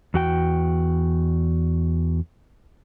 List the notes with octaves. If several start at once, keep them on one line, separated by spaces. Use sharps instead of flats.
E2 F#4 G5